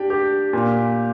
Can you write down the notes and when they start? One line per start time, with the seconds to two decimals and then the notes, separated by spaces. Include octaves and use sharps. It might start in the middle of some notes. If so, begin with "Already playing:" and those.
Already playing: D4 G4
0.10 G4
0.53 A#2